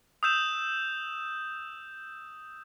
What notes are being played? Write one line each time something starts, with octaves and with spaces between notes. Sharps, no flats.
D#6 E6 G6 E7